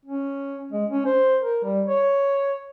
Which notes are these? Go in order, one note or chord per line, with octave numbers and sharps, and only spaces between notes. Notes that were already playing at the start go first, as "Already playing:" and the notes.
C#4
G#3
C#4
C5
A#4
G3
C#5